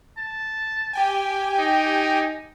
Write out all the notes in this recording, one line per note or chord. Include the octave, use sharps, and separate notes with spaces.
A5
G4 G5 G#5
D#4